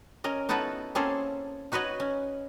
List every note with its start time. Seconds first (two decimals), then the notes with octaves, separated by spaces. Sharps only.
0.24 C#4 A#4 D#5
0.49 B3 D#4 E4 F#4 A4 B4
0.95 A#3 C4 C#4 G#4 A4
1.72 D#4 F#4 B4 C#5 D#5
2.00 C#4